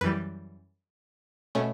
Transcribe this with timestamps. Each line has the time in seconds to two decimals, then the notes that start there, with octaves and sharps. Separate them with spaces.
0.01 F#2 E3 G3 B4
1.55 B2 A3 C#4